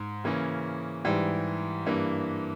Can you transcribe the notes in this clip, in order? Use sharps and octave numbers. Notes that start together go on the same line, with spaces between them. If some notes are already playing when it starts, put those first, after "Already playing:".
Already playing: G#2
C#3 E3 A#3 C#4
G#2 E3 G3
G2 E3 A#3